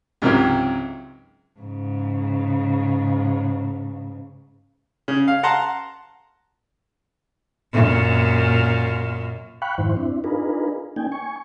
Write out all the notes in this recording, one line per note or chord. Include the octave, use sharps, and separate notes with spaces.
C#2 G#2 C3 F#3 G4 A#4
G#2 C#3
C#3
F5
F#5 A5 A#5 C6
F#2 A#2
F5 G5 B5 C#6 F#6
F2 G#2 D#3 E4 C5
C4 D4 E4
D4 D#4 F4 G#4 A#4 B4
A#3 C#4 D#4 G5 G#5
G#5 C#6